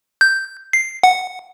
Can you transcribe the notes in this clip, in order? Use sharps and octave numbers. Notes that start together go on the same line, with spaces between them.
G6
C7
F#5